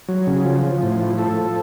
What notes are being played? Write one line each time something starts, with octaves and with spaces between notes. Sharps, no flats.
F#3
C#3
F3
F3
A2
F3
F3 A4
F3